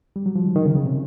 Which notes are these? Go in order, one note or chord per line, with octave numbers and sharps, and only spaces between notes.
G3
F#3
F3
D#3
D#3
C#3
C#3
C3